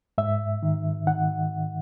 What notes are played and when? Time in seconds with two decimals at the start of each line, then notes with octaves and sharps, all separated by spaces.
0.18 G#2 E5
0.63 D#3
1.07 D#3 F#5